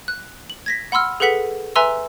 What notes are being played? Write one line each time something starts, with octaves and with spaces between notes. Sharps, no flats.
F#6
F#7
G#6 A#6 B6
F#5 B5 C6 E6 F6
G#4 A4 B4 F#5 B6 F#7
B4 E5 G#5 A#5 C6 E6